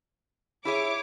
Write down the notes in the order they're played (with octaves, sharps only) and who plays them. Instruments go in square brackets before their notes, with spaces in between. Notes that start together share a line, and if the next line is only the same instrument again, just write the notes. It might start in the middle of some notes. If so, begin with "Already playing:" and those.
[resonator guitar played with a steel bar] E4 G#4 E5 [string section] C#5 D6